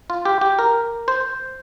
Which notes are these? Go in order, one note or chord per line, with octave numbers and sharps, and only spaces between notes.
F4
G4
G4
A#4
C5